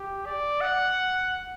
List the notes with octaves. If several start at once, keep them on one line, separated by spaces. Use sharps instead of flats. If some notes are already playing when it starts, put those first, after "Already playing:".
Already playing: G4
D5
F#5